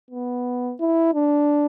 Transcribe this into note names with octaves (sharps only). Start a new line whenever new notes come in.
B3
E4
D4